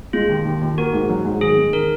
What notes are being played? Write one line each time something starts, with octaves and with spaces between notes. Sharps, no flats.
G#3 F4
D#2
D#2
D#2
A#3 F#4
G#2
F#3
G#2
D#3 G#4
G#3
D#3 A#4